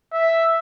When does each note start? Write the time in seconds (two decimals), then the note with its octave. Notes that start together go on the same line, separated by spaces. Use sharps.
0.13 E5